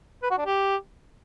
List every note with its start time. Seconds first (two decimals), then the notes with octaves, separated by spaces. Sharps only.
0.23 B4
0.30 F#4
0.38 D4
0.46 G4